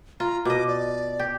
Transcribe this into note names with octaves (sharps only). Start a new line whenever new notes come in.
F4 A#5
B2 D#5 D6
D5
G4